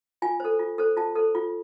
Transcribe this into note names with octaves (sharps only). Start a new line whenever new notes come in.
F4 G#5
A4 C5
F4
A4 C5
F4 A5
A4 C5
F4